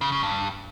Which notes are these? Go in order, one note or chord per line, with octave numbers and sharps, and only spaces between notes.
C#3
C#3
G2